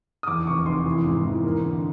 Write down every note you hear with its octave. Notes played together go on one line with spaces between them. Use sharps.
D#6
E2 D6
F1 C#6
F1 C6
E3
G#2
E3
A#3
D3